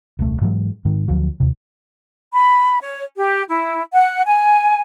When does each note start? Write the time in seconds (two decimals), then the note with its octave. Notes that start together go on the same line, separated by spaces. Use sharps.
0.19 D#1 C2 A3
0.41 G#2 E3 F#3 G#3
0.85 G#2 D#3
1.08 D2 F3 F#3
1.40 D#2 C3
2.33 B5
2.81 C#5
3.17 G4
3.48 E4
3.93 F#5
4.26 G#5